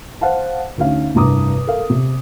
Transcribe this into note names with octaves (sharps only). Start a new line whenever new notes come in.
C5 F5 F#5 A5
D2 C#4 D#4 F5
F1 C2 G2 A#5 D6 D#6
A4 A#4 F5
C3